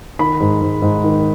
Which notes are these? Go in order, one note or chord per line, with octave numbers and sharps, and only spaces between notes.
D#3 B5
G#2
G#2
G#2
D#3